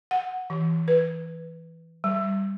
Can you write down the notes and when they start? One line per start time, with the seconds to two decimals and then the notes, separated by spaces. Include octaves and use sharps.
0.11 F#5
0.50 E3
0.88 B4
2.04 G3